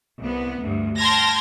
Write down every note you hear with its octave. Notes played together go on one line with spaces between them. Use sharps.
C2 B3
D2 G2
G5 A5 C6 F6 G#6 A#6